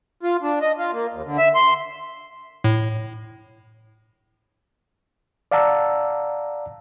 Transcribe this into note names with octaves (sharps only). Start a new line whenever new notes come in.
F4
D4
D#5
F4
A#3
D#2
D3
E5
C6
A2
D5 F5 F#5 A5 A#5 E6